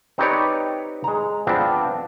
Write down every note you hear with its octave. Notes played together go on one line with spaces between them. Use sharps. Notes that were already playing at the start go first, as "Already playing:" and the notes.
C4 D#4 G4 B4 C#5 D5
G#3 A#5
F3 B3 C4 D4